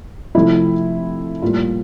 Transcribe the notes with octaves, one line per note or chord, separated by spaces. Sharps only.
C3 F3 A3 E4
A2 G3 A#3 F4